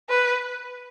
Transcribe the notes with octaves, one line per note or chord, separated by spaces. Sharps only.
B4